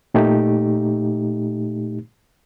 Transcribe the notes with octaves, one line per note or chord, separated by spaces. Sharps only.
A#2 A3 D#4 G4